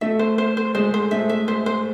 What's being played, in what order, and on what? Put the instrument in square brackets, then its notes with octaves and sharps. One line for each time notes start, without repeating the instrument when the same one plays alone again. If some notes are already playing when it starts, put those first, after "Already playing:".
[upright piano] A3 [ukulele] E5
[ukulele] C5
C5
C5
[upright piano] G#3 [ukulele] C5
[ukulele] C5
[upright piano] A3 [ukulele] E5
[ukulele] E5
C5
C5